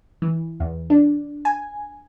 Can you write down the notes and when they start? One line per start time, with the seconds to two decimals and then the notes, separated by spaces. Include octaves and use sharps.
0.22 E3
0.60 E2
0.90 D4
1.45 G#5